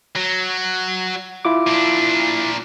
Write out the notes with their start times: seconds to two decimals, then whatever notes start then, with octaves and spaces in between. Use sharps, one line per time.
0.16 F#3
1.45 E4 F4 D6
1.67 A#2 D4